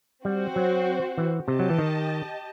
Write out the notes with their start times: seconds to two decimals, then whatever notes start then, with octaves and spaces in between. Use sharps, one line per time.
0.25 G3 C4 F#4 C5
0.56 F#3
1.17 E3
1.48 C3 G4 D#5 A5
1.59 F#3
1.70 E3
1.79 D#3